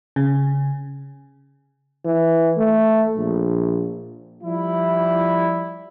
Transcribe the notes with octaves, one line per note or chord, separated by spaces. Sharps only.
C#3
E3
A3
A#1
F3 G3 E4